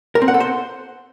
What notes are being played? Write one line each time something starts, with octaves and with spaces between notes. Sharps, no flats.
A#4
C4
F#5
A4
C5